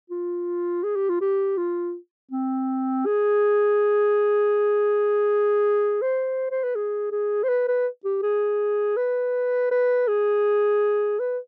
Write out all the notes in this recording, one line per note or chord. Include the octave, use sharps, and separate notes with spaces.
F4
G#4
G4
F4
G4
F4
C4
G#4
C5
C5
B4
G#4
G#4
C5
B4
B4
G4
G#4
B4
B4
G#4
B4